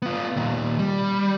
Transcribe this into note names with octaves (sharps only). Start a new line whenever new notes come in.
B3 F4
A#2 D#3
G3